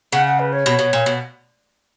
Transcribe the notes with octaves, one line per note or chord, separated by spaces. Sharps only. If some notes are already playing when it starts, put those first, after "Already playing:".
C#3 F#5
F#5
B4
C#5
B2
B2
A#2
B2